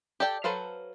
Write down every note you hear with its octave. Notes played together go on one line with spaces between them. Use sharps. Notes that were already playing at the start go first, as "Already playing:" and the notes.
G4 A4 D5 G5
F#3 A4 B4 C5 F5